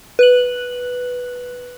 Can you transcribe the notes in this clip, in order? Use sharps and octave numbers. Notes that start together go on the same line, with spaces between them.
B4 F#6 F#7